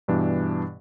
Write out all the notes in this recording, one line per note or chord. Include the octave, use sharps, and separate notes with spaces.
G2 B2 E3 D4